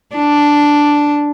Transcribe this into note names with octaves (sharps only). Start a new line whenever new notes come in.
D4